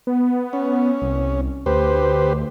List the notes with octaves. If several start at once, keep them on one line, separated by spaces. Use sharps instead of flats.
B3
C#4
C2
D2 G4 B4 C5